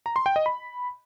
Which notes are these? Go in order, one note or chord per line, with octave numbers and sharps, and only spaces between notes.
A#5
C6
G5
D#5
B5